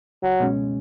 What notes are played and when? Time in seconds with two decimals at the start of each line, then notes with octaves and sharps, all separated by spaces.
0.23 C#2 F#3
0.40 B2 G#3 C#4